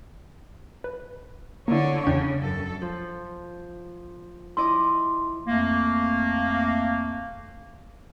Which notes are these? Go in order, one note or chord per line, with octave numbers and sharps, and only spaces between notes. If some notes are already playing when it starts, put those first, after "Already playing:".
B4
D3 A#3 E4 C#5
E2 C#3 D4 G5
F#2 A4
F3
E4 D#5 C6 D6
F2 A3 A#3